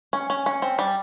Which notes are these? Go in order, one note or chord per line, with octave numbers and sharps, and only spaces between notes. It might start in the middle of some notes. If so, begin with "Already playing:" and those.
C#4
C#4
C#4
C4
G3